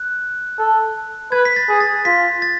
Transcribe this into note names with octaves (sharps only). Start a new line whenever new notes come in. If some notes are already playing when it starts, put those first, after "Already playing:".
Already playing: F#6
A4
B4 G#6
B6
A6
G#4
A6
F4 B6
A6